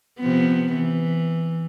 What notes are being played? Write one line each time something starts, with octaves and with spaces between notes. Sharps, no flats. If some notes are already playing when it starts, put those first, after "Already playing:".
C3 F3 B3
E3